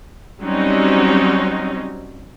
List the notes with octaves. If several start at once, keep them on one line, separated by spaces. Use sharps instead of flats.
F#3 G3 C4 C#4 D#4